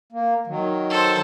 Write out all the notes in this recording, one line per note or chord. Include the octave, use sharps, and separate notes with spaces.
A#3
D#3 F#3
A4 C5